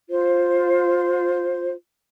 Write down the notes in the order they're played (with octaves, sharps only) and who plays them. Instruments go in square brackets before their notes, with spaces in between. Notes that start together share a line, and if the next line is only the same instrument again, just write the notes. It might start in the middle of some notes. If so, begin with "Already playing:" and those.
[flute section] F4 C5